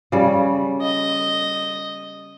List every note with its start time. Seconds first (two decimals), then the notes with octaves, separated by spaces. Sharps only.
0.12 C#3 G3
0.82 D#5